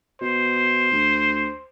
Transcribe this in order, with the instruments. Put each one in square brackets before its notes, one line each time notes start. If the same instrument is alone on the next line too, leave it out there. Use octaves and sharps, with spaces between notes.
[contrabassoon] B2 [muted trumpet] C5
[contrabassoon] D2